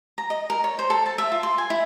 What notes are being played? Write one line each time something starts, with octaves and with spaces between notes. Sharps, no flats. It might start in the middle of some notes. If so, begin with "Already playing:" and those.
A#5
D#5
A#4
C#5
C5
A4
A5
E5
F4
C6
G#5
E4